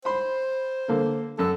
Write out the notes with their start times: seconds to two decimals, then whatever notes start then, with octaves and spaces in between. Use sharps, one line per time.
0.05 C5 B5 C6
0.88 D3 A#3 A4
1.39 F#2 A4 E6